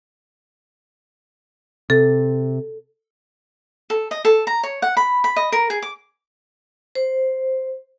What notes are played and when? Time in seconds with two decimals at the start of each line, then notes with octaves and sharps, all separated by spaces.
1.90 C3 A4
3.90 A4
4.11 D#5
4.25 A4
4.47 A#5
4.63 C#5
4.82 F#5
4.97 B5
5.24 B5
5.36 D#5
5.52 A#4
5.70 G#4
5.82 D6
6.95 C5